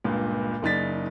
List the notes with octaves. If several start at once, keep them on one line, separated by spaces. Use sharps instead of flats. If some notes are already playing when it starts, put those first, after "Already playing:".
C#2 G2 A#2
F#1 C#3 D#4 D5 A6 B6